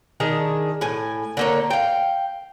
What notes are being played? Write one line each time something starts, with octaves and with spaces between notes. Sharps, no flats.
D#3 D4 G#4
A2 G#5
D3 A#3 C#5
F5 G5